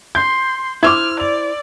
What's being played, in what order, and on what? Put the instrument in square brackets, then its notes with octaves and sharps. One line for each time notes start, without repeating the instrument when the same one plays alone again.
[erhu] C6 [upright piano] G6
[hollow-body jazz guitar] E4 C5 [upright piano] D6 E6 G#6 [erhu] F6
[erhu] D5 [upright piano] F7